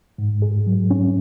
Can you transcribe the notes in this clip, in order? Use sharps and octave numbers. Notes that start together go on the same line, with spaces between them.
G#2
G#4
F#3
C#4